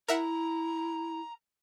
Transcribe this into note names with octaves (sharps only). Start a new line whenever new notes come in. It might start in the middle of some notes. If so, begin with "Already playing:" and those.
E4 A#4 E5 F#5 A#5